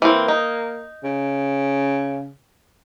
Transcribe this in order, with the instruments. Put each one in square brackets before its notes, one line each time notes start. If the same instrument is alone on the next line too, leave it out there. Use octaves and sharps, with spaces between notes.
[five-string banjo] E3 C4 [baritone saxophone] A#3
[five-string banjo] D#4
[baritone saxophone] C#3